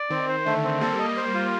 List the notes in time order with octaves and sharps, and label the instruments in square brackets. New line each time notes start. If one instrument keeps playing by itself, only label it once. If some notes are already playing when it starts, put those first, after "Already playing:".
Already playing: [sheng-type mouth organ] D5
[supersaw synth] D#3 [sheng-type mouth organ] C4
[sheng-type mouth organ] C5
[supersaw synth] D3 [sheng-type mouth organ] A3
[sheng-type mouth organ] C4
[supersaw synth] G3 A#3 [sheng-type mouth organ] A4
[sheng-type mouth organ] D#5
[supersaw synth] G3 A#3 [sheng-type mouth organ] C5
[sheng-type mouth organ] F4